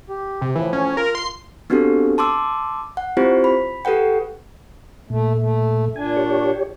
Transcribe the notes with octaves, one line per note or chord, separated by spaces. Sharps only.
G4
C3
A2 E3 F3
C#4
F4 A#4
C6
B3 C4 D4 F#4 G4 A4
A5 C6 D6 E6
F#5
C4 E4 F4 G4 C5
B5
G4 A4 B4 F#5 G5
A#2 A3
A3
A#2 D4 G#5
G4 C#5